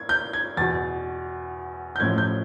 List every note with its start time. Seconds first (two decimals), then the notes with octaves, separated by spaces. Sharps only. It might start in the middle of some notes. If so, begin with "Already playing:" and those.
Already playing: G#6
0.09 G6
0.33 G#6
0.57 E2 B2 A6
1.96 G6
2.00 A1 A2 F3 G#6
2.18 G6